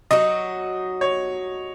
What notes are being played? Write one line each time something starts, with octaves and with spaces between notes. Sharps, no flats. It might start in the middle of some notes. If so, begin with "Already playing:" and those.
F#3 D#4 F#4 D#5
C#5